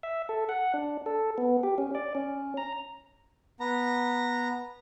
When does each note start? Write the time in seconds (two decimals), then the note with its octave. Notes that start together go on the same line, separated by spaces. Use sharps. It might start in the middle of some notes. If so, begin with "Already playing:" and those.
0.03 E5
0.29 A4
0.49 F#5
0.74 D4
1.06 A4
1.38 B3
1.63 G4
1.78 C#4
1.95 D5
2.15 C#4
2.57 A#5
3.60 B3 A#5